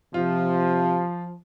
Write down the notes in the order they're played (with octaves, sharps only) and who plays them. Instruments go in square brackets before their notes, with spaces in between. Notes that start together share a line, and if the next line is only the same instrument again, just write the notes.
[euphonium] C3 [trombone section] F3 [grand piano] F4